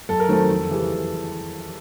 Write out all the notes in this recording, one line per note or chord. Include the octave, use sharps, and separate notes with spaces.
F#2 A4
A#4
D#3 F#3 A3 C4 A4
F2
C#3 E3 G3